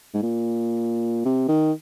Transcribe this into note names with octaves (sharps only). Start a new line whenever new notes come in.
G#2
A#2
C3
D#3